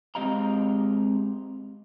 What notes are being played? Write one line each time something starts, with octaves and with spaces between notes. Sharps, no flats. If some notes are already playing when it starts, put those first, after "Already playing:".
G#3 C4 G4 D#5 F5 A#5